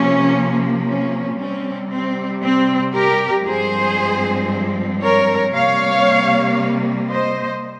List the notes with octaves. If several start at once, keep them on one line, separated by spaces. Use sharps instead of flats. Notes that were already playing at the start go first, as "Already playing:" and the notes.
Already playing: C3 F3 A#3 C#4
C#4
C3 G3 C4 C#4
C4
C4
G4 A#4
G2 F3 G#3 C4 G#4 C5
A#4 C#5
C3 G3 A#3 C#5 F5
C5 D#5